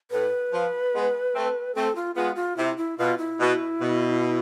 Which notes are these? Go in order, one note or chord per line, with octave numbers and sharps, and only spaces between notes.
A2 B4
F3
G#3 B3
A3 C4
A3 C4 A4
F4
G#3 B3 F4
F4
C3 E4
E4
B2 F4
E4
B2
B2